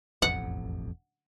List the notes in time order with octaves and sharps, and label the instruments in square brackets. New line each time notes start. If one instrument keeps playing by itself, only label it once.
[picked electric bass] E1 A1 F2 [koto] F#5